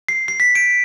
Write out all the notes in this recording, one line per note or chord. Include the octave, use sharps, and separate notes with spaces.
C7
C7
B6
D7